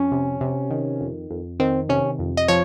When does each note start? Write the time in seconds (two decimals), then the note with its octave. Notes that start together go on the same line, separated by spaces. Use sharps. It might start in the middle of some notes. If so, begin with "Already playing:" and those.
Already playing: F2 C#4
0.12 C3
0.41 C3
0.71 D#3
1.01 F2
1.31 F2
1.60 D#3 C4
1.89 C3 C#4
2.19 F2
2.37 D#5
2.48 F3 C#5